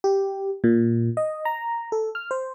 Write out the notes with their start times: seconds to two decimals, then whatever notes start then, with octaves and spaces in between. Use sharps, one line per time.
0.04 G4
0.64 A#2
1.17 D#5
1.45 A#5
1.92 A4
2.15 F6
2.31 C5